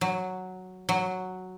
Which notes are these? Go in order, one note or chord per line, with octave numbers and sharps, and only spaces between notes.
F#3
F#3